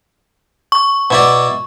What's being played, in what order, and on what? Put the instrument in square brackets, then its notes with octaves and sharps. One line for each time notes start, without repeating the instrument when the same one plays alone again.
[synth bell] C#6
[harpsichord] B2 E4 D5